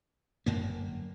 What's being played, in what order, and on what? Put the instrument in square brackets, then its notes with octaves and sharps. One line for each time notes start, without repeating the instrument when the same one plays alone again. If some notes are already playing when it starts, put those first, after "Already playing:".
[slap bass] G1 F#2 A#3